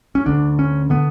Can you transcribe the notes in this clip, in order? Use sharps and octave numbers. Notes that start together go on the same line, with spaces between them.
C#4
D2 D3 D4
C#4
D3 B3